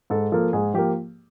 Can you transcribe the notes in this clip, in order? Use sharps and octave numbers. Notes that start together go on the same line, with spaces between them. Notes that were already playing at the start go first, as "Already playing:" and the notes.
G#2 A4
F3 A#3 A4
G#2 G#4
F3 A#3 G4